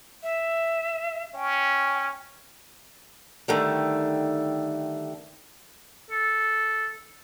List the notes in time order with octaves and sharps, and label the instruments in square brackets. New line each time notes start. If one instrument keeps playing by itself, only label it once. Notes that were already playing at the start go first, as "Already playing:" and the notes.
[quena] E5
[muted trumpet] C#4 [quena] G5
[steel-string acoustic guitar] D3 D#3 G3 A3
[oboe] A4